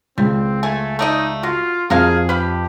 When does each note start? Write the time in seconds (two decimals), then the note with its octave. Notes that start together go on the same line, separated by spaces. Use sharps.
0.18 C#2 G3 C4
0.63 A3 G#5
0.99 A3 D#4 D5 D#5
1.43 F4 F#4
1.90 F2 F#4 G#4 A#4 F5
2.29 G4 B4 F5 B5